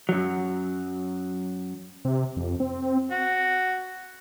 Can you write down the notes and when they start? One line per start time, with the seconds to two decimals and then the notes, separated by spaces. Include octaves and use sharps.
0.09 F#2 F#3
2.05 C3
2.37 F2
2.60 C4
3.11 F#4